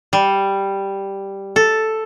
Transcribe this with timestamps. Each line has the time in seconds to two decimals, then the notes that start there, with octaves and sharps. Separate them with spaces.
0.13 G3
1.56 A4